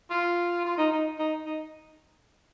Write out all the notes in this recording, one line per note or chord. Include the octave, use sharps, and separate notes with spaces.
F4
F4
D#4
D#4
D#4
D#4